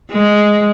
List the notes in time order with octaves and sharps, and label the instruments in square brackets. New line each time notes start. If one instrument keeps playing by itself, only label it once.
[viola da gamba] G#3